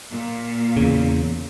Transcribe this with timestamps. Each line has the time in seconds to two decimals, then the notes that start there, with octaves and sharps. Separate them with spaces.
0.11 A#2
0.77 E2 C#3